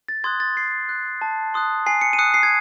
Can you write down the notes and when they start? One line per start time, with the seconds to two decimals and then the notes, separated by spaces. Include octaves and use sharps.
0.08 A6
0.24 C6 D#6 F#6 G#6
0.40 A6
0.56 C6 C7
0.89 F#6
1.21 A5
1.54 C6 D#6 F#6
1.86 G#5 C7
2.01 C#7
2.13 D#7
2.19 D#6 F#6 C#7
2.34 C7
2.43 G#6